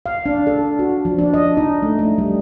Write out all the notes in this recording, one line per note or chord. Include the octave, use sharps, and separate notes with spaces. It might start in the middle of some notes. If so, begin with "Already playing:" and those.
F5
D4
A4
F#4
F3
D4
D#5
D#4
A3
A3
G3